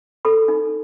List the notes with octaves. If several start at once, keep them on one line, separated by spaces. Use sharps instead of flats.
A4 B5
D#4